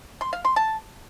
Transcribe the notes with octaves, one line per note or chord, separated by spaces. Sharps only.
C6
F5
C6
A5